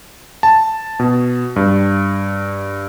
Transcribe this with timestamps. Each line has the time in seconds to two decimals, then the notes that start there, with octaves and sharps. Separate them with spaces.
0.43 A5
1.00 B2
1.56 G2